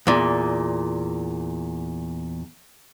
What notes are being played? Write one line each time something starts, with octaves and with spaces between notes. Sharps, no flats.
E2 A#2